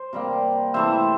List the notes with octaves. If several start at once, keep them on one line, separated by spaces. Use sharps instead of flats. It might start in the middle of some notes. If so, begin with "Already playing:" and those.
Already playing: C5
C3 G3 A#3
C3 E3 A3 C5 E5